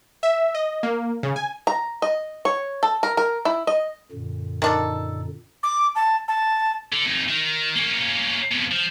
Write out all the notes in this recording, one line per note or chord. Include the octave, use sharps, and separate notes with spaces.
E5
D#5
A#3
C#3
G#5
A#5
D#5
C#5
A4
A#4
A#4
E4
D#5
F#2 A#2 D3
D#3 D4 A4
D6
A5
A5
D3
F2 D#4
D#3
A#3 C#4
F2 B2
F3